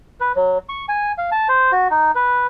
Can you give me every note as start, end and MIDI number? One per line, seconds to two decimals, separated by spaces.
0.21 0.32 71
0.36 0.58 54
0.69 0.86 85
0.89 1.12 80
1.18 1.30 77
1.32 1.48 81
1.49 1.72 72
1.72 1.88 66
1.91 2.11 63
2.15 2.47 71